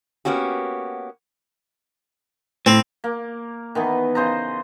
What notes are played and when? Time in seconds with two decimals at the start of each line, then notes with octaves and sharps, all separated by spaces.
0.25 A#3 B3 C#4 F#4 G4
2.66 A2 C4
3.04 A#3
3.75 D#3 E3 B3
4.15 C#3 C5 D#5 A#5